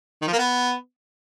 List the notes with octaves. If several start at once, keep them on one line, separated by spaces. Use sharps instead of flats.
D#3
F3
A#3
B3